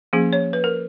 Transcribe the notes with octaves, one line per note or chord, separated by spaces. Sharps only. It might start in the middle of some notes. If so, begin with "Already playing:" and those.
F3 A#3 C#4 G#4
C#5
B4
A#4